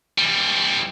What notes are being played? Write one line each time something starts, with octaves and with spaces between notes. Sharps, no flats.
E3 G3